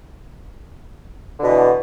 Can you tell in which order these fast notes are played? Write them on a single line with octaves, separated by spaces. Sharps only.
D3 B2 E3